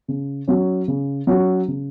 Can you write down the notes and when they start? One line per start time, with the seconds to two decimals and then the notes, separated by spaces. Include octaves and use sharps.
0.08 C#3
0.48 F#3 C#4 F#4
0.88 C#3
1.27 F#3 C#4 F#4
1.68 C#3